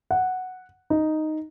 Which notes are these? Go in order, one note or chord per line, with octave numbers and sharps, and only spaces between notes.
F#5
D#4